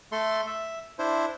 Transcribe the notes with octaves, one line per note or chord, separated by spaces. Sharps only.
A3 A4 C6
E5
D4 E4 C5